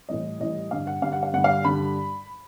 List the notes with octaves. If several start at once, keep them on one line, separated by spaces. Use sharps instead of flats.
A2 E3 G3 D#5
A2 E3 G3 D#5
G2 D3 G3 F5
F#5
G2 D3 G3 F5
F#5
F5
G2 D3 G3 F#5
F5
G2 D3 G3 B5